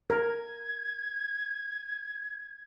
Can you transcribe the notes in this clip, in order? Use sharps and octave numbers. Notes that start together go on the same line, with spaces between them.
A#4 G#6